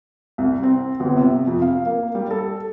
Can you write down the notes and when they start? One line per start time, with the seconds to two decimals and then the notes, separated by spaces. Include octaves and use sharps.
0.38 C2
0.63 C4
1.00 G1
1.17 C3
1.47 F2
1.62 F5
1.86 A#3
2.15 G3
2.31 A4